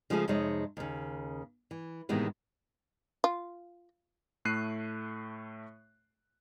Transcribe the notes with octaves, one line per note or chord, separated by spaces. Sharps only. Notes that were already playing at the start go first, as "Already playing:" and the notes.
C#3 F3 G#3 A3 F4 G#4
F2 C3 G#3 D#4 C#5
D#2 C#3
E3
A2 C3 D#3 E3 G#3 B3
F4
A2 A3 F#6 C7 D#7